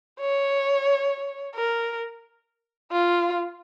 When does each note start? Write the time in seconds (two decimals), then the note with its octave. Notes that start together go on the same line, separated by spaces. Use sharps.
0.20 C#5
1.55 A#4
2.92 F4